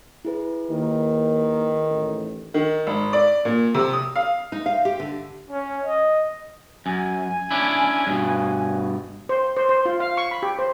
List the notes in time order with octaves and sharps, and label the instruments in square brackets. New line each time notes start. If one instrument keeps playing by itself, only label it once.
[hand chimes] E4 G#4 B4
[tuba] D#2 [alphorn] D#3
[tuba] A1
[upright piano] D#3
G#1
D5
A#2
C3
D#6
F5
[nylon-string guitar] D#4
F5
G4
D3
[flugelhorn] C#4
D#5
[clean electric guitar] F#2 [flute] G#5
[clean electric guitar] C#4 D4 E4
G2 B2
[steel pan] C5
C5
C5
F4
F5
C#6
B5
G4
C5